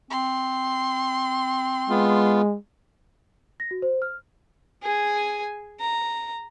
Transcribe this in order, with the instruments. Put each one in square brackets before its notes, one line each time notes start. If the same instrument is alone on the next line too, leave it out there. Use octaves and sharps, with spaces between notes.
[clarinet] C4 [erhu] C6
[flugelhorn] G#3 [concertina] B3 F4
[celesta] A#6
F#4
C5
F6
[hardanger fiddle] G#4 G#5
A#5